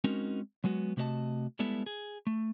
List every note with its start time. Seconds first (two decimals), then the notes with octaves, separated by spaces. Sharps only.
0.04 G#3 C4 C#4 D#4 F#4 A#4
0.64 F#3 G#3 B3 F#4
0.97 C3 A3 F#4 A4 D#5 A5
1.59 G3 G#3 B3 E4 A4
1.86 G#4
2.27 A3